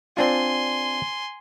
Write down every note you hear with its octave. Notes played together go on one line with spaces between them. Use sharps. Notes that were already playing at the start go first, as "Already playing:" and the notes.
C4 D4 F4 G#5 C6